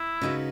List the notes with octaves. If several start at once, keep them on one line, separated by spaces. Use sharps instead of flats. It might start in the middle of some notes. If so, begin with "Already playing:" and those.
Already playing: E4
C#3 G#3 D#4 F#4 B4